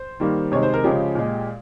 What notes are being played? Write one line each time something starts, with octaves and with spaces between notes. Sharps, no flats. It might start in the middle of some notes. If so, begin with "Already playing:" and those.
Already playing: C5
D#3 G3 A#3
C3 D#3 G#3 C#5
C5
A#4
C#3 F3 G#3 G4
A#2 G#3